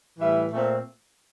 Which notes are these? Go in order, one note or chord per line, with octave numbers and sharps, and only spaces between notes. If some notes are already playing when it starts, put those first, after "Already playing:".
A2 E3 G3 E5
A#2 A3 C4